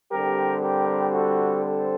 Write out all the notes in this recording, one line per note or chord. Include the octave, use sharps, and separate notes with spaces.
D3 G3 C4 G4 A#4
G4 A#4
F#4 A4
A4 C5